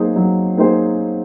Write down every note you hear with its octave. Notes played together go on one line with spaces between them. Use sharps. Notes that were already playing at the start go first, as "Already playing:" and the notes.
Already playing: F#3 A#3 D#4 G#4 C5
F#3
A#3 D#4 G#4 C5